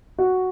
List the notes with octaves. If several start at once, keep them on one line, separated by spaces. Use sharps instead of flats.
F#4